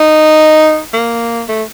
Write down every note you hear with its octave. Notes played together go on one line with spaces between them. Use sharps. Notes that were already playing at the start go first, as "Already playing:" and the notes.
Already playing: D#4
A#3
A3